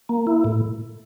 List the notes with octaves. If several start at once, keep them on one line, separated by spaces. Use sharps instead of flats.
A#3
E4
A2